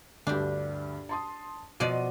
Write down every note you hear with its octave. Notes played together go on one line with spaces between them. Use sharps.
D2 G2 D4 G4
A5 C6 D#6
B2 F3 D5 D#5 D#7